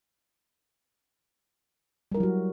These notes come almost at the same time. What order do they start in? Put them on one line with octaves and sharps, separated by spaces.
G3 A#4 E4 F#3 F#4